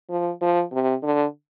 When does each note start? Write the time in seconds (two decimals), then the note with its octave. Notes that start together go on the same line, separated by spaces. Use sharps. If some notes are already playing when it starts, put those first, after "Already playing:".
0.10 F3
0.41 F3
0.72 C3
1.03 D3